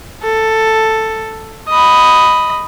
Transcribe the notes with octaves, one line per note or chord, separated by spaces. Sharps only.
A4
D#5 B5